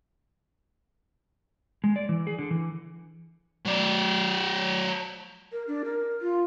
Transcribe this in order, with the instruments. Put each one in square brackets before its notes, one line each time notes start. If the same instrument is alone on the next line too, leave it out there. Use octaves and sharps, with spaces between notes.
[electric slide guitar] G#3
D5
E3
G#4
D3
E3
[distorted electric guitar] F#3 D5
[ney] A#4
D4
A#4
F4